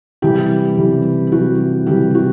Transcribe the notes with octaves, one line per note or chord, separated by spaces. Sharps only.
C3 E3 G3 G4
C3 E3 G3
C3 E3 G3 F#4
C3 E3 G3 G4
F#4